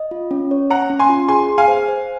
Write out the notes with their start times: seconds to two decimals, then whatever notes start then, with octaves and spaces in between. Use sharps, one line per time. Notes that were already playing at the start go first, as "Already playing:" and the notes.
Already playing: D#5
0.11 F4
0.31 C#4
0.51 C#5
0.70 C#5 F#5 A#5
0.90 C#4
0.99 G#5 C6
1.09 F4
1.28 G#4 G#5 C6
1.49 G#4
1.58 F5 G#5
1.68 C5
1.88 C5